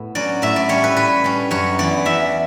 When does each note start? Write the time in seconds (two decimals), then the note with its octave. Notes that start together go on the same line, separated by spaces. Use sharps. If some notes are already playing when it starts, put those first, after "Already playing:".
Already playing: A2 B3
0.15 F#3 C#4 D5
0.42 A2 E5
0.56 D5
0.69 G3 C#4 C#5
0.84 B4
0.96 A2 B4
1.24 G3 C#4
1.51 F#2 C#5
1.79 E3 B3 D5
2.05 E2 E5